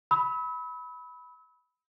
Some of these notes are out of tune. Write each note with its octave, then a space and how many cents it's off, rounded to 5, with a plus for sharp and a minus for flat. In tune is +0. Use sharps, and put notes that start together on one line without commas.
B5 +0 E6 -40